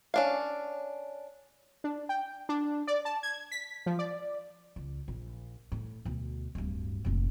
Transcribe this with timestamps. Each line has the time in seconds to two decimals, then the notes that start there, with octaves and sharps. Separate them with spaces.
0.14 C#4 D4 F5
1.84 D4
2.09 G5
2.49 D4
2.87 D5
3.05 A5
3.23 G#6
3.52 B6
3.86 F3
3.99 D5
4.76 C#2
5.08 A#1
5.72 A2
6.05 D2 B2
6.55 D1 G2
7.05 F1 A#2